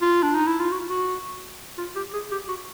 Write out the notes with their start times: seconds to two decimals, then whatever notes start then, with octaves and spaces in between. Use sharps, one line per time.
0.01 F4
0.23 D4
0.35 D#4
0.47 E4
0.60 F4
0.72 F#4
0.89 F#4
1.78 F4
1.96 G4
2.13 G#4
2.31 G4
2.48 F#4